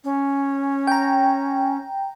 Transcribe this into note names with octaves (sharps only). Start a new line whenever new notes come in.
C#4
G5 A#5